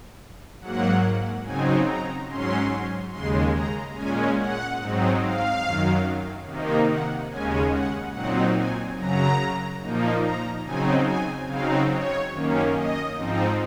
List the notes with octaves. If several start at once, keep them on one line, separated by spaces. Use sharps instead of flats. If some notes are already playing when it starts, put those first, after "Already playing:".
G#2 F#3 A#3 F#5
C#3 F#3 C4 D#4 G#5
A#5
G#2 F#3 C#4 C6
D#2 C#3 G#3 C6
A#5
A#2 G#3 C#4 G#5
F#5
G#2 F#3 C4 D#4
F5
F#2 D#3 F#3
C3 D#3 A#3 D#4
F#5
D#2 C#3 G#3 C#4 G#5
F#5
A#2 F#3 C4 D#4 F#5
G#5
F#2 C#3 F#3 A#5
A#2 F3 A#3 D#4
A#5
C#3 F#3 C4 D#4 G#5
G#5
C#3 F#3 C4 D#4 F5
C#5
F#2 D#3 A#3 C#4
D#5
G#2 F3 C4 D#4